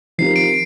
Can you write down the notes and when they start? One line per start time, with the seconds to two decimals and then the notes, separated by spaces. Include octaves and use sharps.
0.18 F3 C4 D#4 G4 A#4 C7
0.36 D7